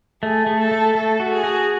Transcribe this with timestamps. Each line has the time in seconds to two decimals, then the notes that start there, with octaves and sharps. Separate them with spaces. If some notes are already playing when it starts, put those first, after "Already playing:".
0.23 A3 G#4
0.47 A3
0.59 A4
0.71 A3
0.95 A3 A4
1.20 F#4
1.32 G#4
1.44 F#4